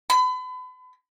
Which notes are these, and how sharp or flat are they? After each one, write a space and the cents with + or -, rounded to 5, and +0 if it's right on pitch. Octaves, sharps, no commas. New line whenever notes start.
B5 +35